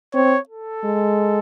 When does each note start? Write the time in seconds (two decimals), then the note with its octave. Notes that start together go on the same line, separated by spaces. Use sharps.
0.14 C4 C#5
0.49 A4
0.84 G#3